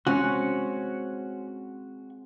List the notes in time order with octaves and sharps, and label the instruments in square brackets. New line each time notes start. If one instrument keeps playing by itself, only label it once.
[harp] G#3 C4 [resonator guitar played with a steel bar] C#4 [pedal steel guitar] F#4 F#5